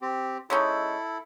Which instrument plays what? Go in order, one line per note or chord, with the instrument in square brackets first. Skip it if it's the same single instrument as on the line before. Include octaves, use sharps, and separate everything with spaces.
[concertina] C4 G4
[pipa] G#3 C#4 D#4 [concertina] E4 A4